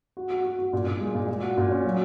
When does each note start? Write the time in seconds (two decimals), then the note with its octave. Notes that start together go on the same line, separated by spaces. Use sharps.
0.17 F#4
0.30 F#4
0.45 F#4
0.59 F#4
0.73 A#2
0.86 A#2
1.01 G#3
1.15 A#2
1.28 A#2
1.42 F#4
1.57 A#2
1.71 C#4
1.85 F#3